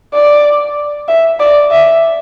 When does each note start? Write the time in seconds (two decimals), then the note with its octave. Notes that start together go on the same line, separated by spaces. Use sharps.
0.14 D5
1.08 E5
1.40 D5
1.71 E5